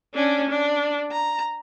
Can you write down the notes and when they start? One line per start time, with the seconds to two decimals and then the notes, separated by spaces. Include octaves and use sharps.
0.14 C#4 D4
0.49 D4
1.11 A#5